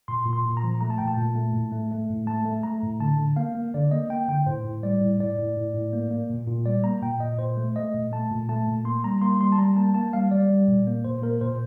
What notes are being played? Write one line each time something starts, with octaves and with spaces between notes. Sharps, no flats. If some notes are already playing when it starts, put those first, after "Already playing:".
A#2 C6
A#2
C6
A#2
A#5
F3
A3 A#5
A5
A#2 G5
A5
A#2
A3
A2
A3
A3
A2
A3 A5
A3
A3 A#5
A2
D3 A5
D3
A#3 F5
A#3
D3 D5
A#3 D#5
A#3 G5
D3 G5
A2 C5
A2
G3 D5
A2
A2 D5
A2
A2
A2
A#3
A#3
A#2
A#2
G3 D5
A#3 A#5
A#2 G5
A#2 D#5
A#2 C5
A3
A3 D#5
A#2
A3 A5
A#2
A3 A5
A#2
A#3 C6
G3 A#5
A#3 C6
G3 C6
A5
G3 A#5
A#3 A5
A#3 A5
G3 F5
G3 D5
G3
A#2
A#3
A#2 C5
A#3 A#4
A#2 C5